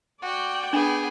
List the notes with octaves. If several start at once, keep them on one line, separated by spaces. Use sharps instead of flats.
F#4 D5 G5
B3 D4 G#4